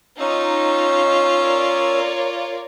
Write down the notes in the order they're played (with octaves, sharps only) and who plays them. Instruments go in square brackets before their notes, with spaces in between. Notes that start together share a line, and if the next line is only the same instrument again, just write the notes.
[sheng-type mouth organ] C#4 E6 [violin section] D#4 [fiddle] F4
[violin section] A#4 C#5 D5